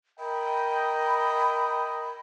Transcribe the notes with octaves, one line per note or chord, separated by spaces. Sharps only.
A#4 D#5 G5 B5